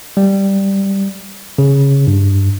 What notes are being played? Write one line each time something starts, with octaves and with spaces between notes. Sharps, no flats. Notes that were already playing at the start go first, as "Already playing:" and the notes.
G3
C#3
G2